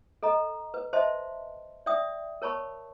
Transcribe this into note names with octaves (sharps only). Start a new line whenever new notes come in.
A4 D#5 A#5
B4
C5 D#5 E5 A5 C6
D5 E5 G5 D#6
A#4 C#5 A5 B5 C#6